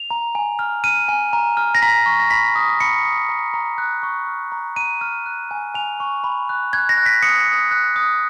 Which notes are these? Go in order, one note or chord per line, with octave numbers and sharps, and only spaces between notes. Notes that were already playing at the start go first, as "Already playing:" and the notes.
Already playing: F7
A#5
G#5
F6
F6 D#7
G#5
A#5
F6
A#6
A#5 B6
C#6
A#6
B5 B6
D#6
B5 C#7
D#6
A#5
A#5
F#6
C#6
F6
A#5
A#5 D#7
F6
F#6
G#5
G#5 F7
C#6
B5
F#6
F#6 G#6
A#6
F#6
B6
D#6 C#7
D#6
F#6
D#6